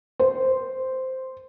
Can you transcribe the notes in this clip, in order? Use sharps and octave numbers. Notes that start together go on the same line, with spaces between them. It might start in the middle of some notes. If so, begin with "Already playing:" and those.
C5